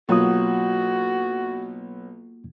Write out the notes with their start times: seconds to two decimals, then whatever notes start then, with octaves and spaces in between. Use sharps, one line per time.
0.09 B1 F#3 A#3 F4 F#4 D#6